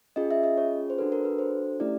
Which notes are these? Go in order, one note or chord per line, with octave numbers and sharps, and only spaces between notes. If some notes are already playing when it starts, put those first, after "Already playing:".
C#4 F4 G#4 D#5
E5
D#5
C#5
C5
D4 F#4 A4 B4
A#4
B4
C5
A3 C#4 E4 G4 D5